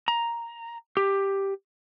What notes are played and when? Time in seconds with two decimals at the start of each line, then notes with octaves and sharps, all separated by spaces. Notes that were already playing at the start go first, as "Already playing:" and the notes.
0.08 A#5
0.97 G4